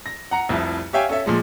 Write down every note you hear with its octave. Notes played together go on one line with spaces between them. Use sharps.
A#6
F#5 A#5 C#7
F1 C2 F2 E4
G4 C#5 E5 F5 G5 G#5
C#4 A4 E5
A#2 F3 G#3